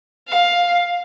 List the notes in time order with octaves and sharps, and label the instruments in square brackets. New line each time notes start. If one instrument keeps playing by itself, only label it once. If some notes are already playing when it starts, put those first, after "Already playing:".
[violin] F5